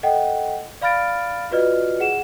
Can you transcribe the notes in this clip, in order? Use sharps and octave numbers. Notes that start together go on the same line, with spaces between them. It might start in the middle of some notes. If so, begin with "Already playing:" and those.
A4 D#5 F#5 G5
D5 F5 B5 F6 A6 D7
F4 F#4 B4 D5 D#5 F6
G#4 F#5 E7